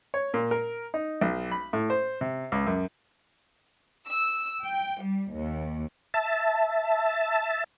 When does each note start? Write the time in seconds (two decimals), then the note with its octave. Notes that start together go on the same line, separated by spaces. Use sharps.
0.14 C#5
0.34 A#2
0.51 A#4
0.94 D#4
1.21 B1
1.51 B5
1.73 A2
1.90 C5
2.21 C3
2.52 C#2
2.66 F#2
4.06 E6
4.64 G5
5.05 G3
5.37 D#2
6.14 E5 A5